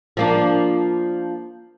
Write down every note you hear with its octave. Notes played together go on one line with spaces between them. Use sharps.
F3 A#3 D4